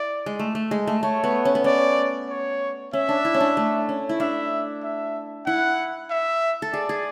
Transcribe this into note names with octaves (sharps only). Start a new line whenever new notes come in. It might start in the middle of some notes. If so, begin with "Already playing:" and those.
Already playing: E4 D5
G#3
A3
A3
G#3
A3
A3 C#5
B3
C#4
B3
C#4 D5
C#5
C#4 E5
D4
E4
C#4
D4
A3
C#4
E4
D4 E5
E5
E4 F#5
E5
A4
G#4 D5
G#4